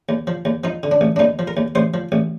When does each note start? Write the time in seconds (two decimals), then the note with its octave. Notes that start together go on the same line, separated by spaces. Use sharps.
0.09 D#2
0.27 F3
0.45 D#2
0.64 F3 D#4
0.83 D3
0.91 D4
1.01 A1
1.16 D4
1.19 D#2 D#4
1.39 F3
1.48 A#4
1.57 D#2
1.75 A1 C5
1.94 F3
2.12 A1